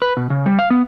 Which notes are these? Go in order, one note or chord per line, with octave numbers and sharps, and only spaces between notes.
B4
B2
C#3
G3
F5
B3